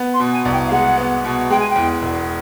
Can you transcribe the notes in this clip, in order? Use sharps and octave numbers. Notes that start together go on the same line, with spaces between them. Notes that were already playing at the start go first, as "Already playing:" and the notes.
Already playing: B3
C6
B2
G#5
C2
G5
F5
G#3 F#5
B3
B2
G#3 G5
G#5
G5
E2
E1